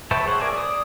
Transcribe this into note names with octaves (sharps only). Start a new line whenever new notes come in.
B4 C#5 E5 G5 A5
G#4 C5 C#5 E5 F#5
G#4 A#4 D5 G#5 A5
D5 D#6